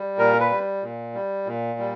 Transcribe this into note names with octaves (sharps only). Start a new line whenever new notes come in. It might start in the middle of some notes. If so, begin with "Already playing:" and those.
Already playing: G3
A#2 A#4
B4
G3
A#2
G3
A#2
G3